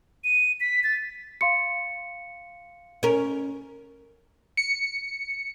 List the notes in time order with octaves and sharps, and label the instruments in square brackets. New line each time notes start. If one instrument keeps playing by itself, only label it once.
[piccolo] D#7
B6
A6
[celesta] F5 C6 C#7
[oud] C#4 A#4
[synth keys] C#7